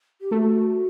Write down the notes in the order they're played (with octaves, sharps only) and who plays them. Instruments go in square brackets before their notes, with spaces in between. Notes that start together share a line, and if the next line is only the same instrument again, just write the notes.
[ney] G4
[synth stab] A3 [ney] F#4